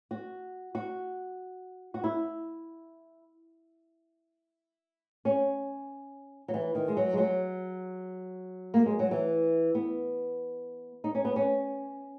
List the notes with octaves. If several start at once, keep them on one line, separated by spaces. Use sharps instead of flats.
F#4
F#4
F#4
E4
C#4
F#3
E3
D#3
G#3
F#3
G#3
F#3
A#3
G#3
F#3
E3
B3
D#4
C#4
B3
C#4